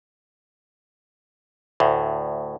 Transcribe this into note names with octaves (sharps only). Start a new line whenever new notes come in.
D2 A2